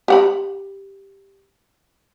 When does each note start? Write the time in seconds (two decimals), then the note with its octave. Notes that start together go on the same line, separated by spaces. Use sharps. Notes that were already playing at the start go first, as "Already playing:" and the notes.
0.08 G4 F#5 B5